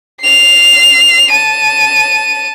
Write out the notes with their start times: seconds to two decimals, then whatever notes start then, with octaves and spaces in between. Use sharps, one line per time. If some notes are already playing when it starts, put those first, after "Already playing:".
0.22 C7 F7
1.31 A5 D#7